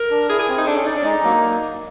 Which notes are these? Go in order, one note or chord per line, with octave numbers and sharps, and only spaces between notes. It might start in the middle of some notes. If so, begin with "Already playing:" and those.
Already playing: A#4
D4
E4 G#4
G#4
C4
D#4
D4 A4
C#4
D#4 D5
D4
G#3 D#4
F#3 A#3